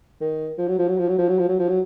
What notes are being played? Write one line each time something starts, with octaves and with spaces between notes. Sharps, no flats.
D#3
F3
F#3
F3
F#3
F3
F#3
F3
F#3
F3
F#3
F3
F#3